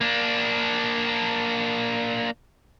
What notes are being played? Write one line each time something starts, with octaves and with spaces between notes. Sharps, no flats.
A#3 D4